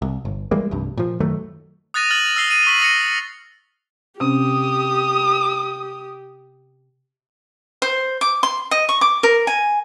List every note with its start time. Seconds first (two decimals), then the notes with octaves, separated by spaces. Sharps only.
0.02 C2
0.25 G1
0.51 E3 G3 G#3 A#3
0.71 F1 C2 G2
0.97 A#2 F3
1.20 F#2 D#3 F#3 A3
1.94 D#6 F#6 A6 A#6 D#7 F7
2.11 F6 A6 F#7
2.36 E6 F6 C7 G7
2.51 D#7
2.67 C#6 B6 F#7
2.80 D#6 A#6 C#7
4.20 C3 C4 C#4 G4 D#6
7.82 C5
8.21 D6
8.43 C6
8.71 D#5
8.89 C#6
9.01 D6
9.23 A#4
9.47 G#5